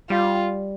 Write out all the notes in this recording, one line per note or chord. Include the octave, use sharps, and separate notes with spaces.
G3 F4